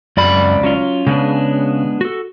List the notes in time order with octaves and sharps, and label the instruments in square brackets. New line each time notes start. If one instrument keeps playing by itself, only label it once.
[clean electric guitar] C#2 D5 B5 [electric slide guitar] F#2
[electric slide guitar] F#3 C#4 F4
[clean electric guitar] C#3 [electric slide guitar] G#3 B3 D4
[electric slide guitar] F#4 A4